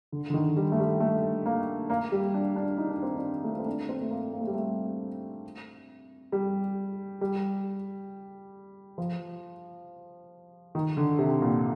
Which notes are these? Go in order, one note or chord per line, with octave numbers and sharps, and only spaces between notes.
D3
D3
D#3
G3
A3
G3
A3
A#3
A#3
G3
D4
D4
D#4
D4
C4
D4
A3
A#3
C4
D4
C4
A3
A#3
A#3
A3
G3
A3
G3
G3
F3
D#3
D3
C3
A#2